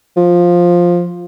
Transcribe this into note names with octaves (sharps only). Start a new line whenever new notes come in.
F3